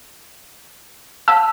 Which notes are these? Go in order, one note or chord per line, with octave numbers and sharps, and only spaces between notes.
F5 A5 E6